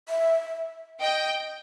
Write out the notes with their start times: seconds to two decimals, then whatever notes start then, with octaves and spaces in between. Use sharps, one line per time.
0.09 E5
1.01 D#5 G5